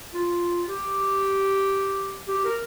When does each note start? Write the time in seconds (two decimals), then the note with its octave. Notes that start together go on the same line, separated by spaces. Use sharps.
0.14 F4
0.67 G4
2.28 G4
2.45 A#4